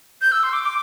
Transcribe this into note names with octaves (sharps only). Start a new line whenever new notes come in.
G6
E6
C6
D6
D6